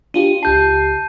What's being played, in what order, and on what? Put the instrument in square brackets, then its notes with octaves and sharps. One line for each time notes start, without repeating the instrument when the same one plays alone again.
[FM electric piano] D4 F4 G4 [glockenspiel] D#7
[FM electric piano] C#2 G4 C7 [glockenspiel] A5 G6